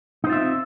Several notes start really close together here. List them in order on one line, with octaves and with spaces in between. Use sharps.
D#4 C5 F4 E5 C4